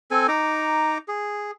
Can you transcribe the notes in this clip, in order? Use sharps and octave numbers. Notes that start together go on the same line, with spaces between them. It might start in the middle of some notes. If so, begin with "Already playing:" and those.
C4 A4 G#5
D#4 A#5 D6
G#4